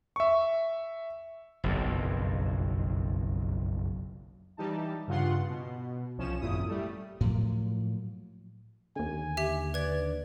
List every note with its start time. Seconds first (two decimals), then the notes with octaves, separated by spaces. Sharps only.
0.16 E5 C#6
1.64 F#1 B1 F2
4.57 E3 G3 D#4 A5
5.08 G2 C#3 F4 F#5 C6
5.49 B2
6.17 C2 F3 C#4 E7
6.41 G#1 F#2 A#2 E4 D#6
6.68 G3 A3
7.21 A2 F3 F#3 A#3
8.96 D#2 D3 G#5
9.37 G4 E5
9.74 B4 D5 G#6